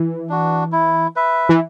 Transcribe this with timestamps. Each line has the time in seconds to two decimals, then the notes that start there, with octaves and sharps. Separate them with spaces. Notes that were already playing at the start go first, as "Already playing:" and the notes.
Already playing: E3
0.29 D4 F#4
0.72 E4
1.16 B4 E5
1.49 E3